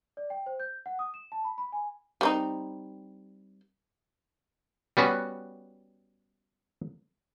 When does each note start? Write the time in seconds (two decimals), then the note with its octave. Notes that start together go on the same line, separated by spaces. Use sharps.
0.17 D5
0.30 G5
0.46 C5
0.60 G6
0.86 F#5
0.99 D#6
1.14 E7
1.32 A5
1.44 B5
1.58 B5
1.72 G#5
2.21 G3 C4 D#4
4.97 G3 B3 C#4 F#4